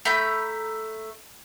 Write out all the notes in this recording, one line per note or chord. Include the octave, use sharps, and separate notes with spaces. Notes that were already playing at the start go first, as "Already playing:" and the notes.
A3 A#5 B5 G6